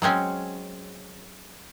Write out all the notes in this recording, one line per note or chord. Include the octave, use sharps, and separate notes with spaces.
F#3 G#3 C4 C#4